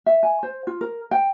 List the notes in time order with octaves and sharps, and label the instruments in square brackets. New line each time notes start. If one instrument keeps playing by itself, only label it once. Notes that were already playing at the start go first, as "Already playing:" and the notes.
[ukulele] E5
G#5
C5
F4
A#4
G5